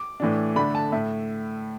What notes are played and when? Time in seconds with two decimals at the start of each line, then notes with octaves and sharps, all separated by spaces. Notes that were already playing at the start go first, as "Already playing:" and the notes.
Already playing: D6
0.20 A2 E3 D4
0.56 D3 A3 D4 B5
0.75 A5
0.92 A2 E5